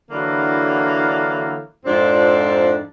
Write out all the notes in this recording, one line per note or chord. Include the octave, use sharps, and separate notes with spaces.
D3 E3 F#3 A#3 D4 E4
F2 G#2 F3 C4 D4